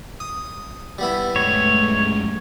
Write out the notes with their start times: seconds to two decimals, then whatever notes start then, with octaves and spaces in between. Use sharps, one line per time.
0.20 D#6
0.98 G3 B3 E4
1.36 F#2 G#3 A3 C#5